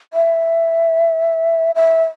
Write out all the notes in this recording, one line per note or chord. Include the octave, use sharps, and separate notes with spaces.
E5
E5